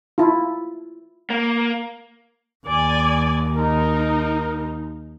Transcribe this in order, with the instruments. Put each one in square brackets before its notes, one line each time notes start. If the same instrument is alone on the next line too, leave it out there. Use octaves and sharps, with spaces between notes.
[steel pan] E4 F4
[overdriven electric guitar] A#3
[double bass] D#2 [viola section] D5 G#5
[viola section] D#4 [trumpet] A#4